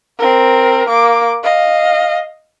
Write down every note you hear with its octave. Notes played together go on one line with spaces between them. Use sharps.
C4 A#4
A#3 D6
D#5 F5